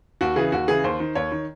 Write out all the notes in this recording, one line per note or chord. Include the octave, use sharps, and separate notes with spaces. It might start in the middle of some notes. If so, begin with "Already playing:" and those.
D#2 F#4
C#3 E3 G#4
D#2 F#4
C#3 E3 G#4
D#2 C5
D#3
D#2 C#5
D#3